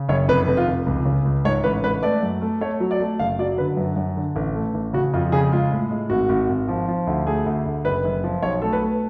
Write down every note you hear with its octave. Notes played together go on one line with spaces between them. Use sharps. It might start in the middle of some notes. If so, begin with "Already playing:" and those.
Already playing: C#3
F#1 C#5
F1 B4
F1
F4
F1
C#2
C#3
C#2
G#2 C#5
A1 B4
G#3 B4
A3 D5
F#2
A3
A3 C#5
F#3
D5
A3
F#1 F5
F#3 D5
D3 B4
F#2
F#2
D3
A1
A3
A1
C#3 F#4
F2 F4
C#3 G#4
G#3 F4
A2
G#3
G#1 F#4
G#1
G#1
F3
F3
D2
A3 G#4
D2
D2
F#1 B4
F#1
F3
B1 C#5
A3 A4
B4
A3